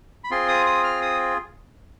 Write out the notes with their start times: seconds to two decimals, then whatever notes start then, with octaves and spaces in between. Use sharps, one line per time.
0.24 B5
0.31 C4 F4 G#4 C6
0.48 D#6
0.66 D#6
0.84 F6
1.02 D#6